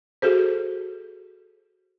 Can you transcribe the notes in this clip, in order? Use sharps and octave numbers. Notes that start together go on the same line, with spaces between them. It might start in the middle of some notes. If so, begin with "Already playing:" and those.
F#4 G#4 A4 C5